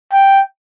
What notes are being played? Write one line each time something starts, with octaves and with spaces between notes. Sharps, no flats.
G5